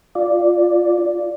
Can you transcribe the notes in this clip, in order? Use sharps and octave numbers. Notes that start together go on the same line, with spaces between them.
F4 D5